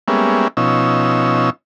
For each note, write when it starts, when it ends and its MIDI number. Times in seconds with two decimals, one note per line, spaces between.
0.08 0.48 55
0.08 0.48 56
0.08 0.48 58
0.08 0.48 59
0.08 0.48 61
0.08 0.48 76
0.57 1.50 47
0.57 1.50 53
0.57 1.50 61
0.57 1.50 63
0.57 1.50 88